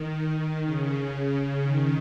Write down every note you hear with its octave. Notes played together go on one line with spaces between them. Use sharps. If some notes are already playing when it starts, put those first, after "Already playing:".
Already playing: D#3
C#3
D#3